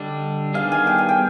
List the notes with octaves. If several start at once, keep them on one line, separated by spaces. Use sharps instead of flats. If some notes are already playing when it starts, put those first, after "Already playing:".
Already playing: D3 G3 D4 D#5
D#3 G3 B3 D4 G#4 F5
G#5
G5
G#5
G5